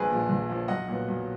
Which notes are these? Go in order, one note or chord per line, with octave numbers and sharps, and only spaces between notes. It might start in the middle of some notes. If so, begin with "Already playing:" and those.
Already playing: A#1 G#4 B4
A#2 F3
A#1
A#2 F3
B1 D#5 F#5
A#2 F#3 B3
B1